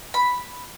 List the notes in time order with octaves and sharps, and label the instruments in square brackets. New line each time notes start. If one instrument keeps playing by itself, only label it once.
[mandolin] B5